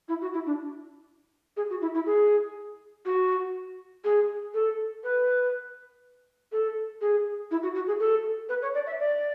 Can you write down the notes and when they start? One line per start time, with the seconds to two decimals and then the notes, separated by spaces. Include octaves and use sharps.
0.08 E4
0.21 F#4
0.34 E4
0.46 D4
1.57 G#4
1.70 F#4
1.81 E4
1.94 E4
2.06 G#4
3.05 F#4
4.04 G#4
4.54 A4
5.04 B4
6.52 A4
7.01 G#4
7.51 E4
7.63 F#4
7.75 F#4
7.87 G#4
8.00 A4
8.49 B4
8.62 C#5
8.74 D5
8.86 E5
9.00 D5